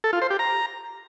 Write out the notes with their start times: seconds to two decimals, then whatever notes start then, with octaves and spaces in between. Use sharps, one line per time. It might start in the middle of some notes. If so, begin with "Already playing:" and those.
0.04 A4
0.13 F4
0.22 C5
0.30 G4
0.39 A#5